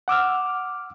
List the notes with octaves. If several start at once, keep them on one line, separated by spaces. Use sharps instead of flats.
F#5 D6 E6 F6